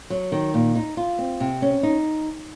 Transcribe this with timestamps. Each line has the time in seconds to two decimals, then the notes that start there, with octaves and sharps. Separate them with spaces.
0.10 F#3
0.32 D#3
0.54 A#2
0.76 D#4
0.97 F4
1.19 C4
1.40 C3
1.62 C#4
1.83 D#4